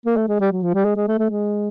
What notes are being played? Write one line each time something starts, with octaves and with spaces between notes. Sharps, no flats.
A#3
A3
G#3
G3
F#3
F3
G3
G#3
G#3
A3
A3
G#3